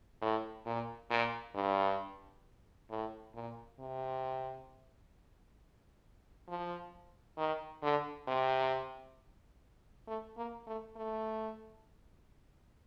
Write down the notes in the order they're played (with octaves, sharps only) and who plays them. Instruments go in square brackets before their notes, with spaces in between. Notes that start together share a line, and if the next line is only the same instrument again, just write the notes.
[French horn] A2
A#2
A#2
G2
A2
A#2
C3
F3
D#3
D3
C3
A3
A#3
A3
A3